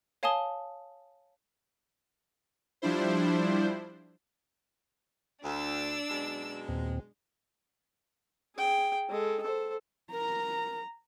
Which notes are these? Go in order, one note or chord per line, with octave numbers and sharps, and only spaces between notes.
C#5 F5 G#5 A5 D#6 G7
F3 G3 D4 E4 C5
D2 D4 E6
F#2 B2 G#3
D#2 A#2 C4
G#4 G5
G#3 A4
A4 C5
A#4 A#5